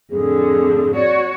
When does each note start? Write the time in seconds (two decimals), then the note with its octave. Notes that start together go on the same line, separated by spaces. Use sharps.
0.11 F2 A2 D3 G#4
0.94 F#4 C#5 D5